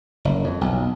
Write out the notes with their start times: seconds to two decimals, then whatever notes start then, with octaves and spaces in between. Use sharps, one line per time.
0.25 F#1
0.44 F2
0.61 B1